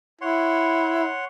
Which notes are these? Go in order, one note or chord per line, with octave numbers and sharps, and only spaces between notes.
E4 C#5 F#5 C6